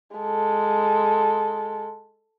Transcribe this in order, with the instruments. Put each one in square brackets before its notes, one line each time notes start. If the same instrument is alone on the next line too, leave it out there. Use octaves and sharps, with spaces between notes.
[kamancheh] G#3 A4